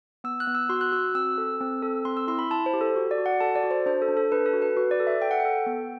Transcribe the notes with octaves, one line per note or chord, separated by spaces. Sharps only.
B3 E6
F#6
B3
E6
F#4 C6
F#6
F#4 E6
C4 E6
A4
C4
A4
C4 C6
E6
E4 C6
B5
E4 A5
C5
G4
A4
F#4
D5
F#4
F#5
A4 A5
D5
F#4
C5
D4 C5
A4
D4
A4
D4 B4
A4
F#4
B4
F#4 B4
D5
A4
E5
A4 G5
F#5
A4 G5
B3